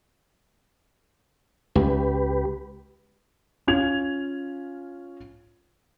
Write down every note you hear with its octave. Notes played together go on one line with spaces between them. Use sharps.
C#2 G4 B4
C#4 F4 G#6 F7